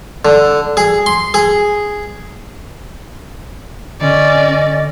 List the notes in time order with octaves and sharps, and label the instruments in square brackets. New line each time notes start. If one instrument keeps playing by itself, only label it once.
[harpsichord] D3
G#4
C6
G#4
[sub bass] D3 [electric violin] C#4 D5 [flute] D#5